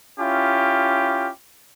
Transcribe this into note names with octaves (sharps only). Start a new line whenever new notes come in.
C#4 E4 F4 G4